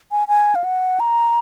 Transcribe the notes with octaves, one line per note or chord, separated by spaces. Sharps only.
G#5
G#5
F5
F#5
A#5